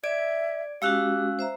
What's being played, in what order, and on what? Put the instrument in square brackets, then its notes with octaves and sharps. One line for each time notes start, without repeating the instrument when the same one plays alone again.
[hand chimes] D5 G#6 D7 [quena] E5
[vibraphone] G#3 C#4 F#4 [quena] G4 [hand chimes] F5 E6 F#6
[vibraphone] C5 E5 A#5